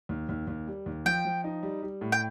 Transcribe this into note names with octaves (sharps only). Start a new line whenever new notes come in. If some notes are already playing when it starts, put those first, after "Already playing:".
D#2
D#2
D#2
G3
D#2
F3 G5
F3
D#4
G3
G3
A2
G5